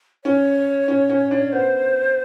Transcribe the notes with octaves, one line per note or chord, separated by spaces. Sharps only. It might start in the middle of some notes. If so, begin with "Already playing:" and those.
C#4 C#5
C#4
C#4
D4
B3 C5